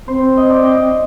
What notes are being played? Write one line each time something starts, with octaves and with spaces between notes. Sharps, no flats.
C4 C5
D#5
D5
D#5